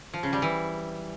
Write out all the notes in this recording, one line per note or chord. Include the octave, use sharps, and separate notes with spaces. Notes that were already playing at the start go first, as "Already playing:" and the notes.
F3
C#3
G3
E3